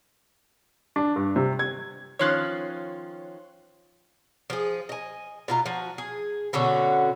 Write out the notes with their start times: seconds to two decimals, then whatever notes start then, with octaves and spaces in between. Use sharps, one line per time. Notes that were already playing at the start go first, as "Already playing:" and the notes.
0.96 D4
1.16 G2
1.36 C3
1.59 G#6
2.19 D#3 F3 C#4 C#5 C6 F#6
4.50 F3 G#4
4.89 D#5 G#5
5.48 B2 F4 A#5
5.66 F3 F#4
5.98 G#4
6.53 B2 D3 C#4 F#4